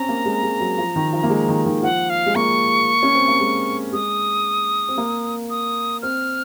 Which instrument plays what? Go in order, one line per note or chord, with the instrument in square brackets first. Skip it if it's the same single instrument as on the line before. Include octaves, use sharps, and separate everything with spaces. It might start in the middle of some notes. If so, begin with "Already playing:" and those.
Already playing: [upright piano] C4 C#4 [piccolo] A#5
[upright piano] A#3
G#3
G#3
F#3
F3
D#3
F3
A#3
G#3
D#3
D#3
[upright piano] F3 [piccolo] F#5
[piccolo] F5
[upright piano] G#3
[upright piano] A#3 [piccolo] C#6
[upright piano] C#4
C4
A#3
G#3
[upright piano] G#3 [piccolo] D#6
[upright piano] C4
A#3
[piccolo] D#6
[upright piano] C4 [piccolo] F6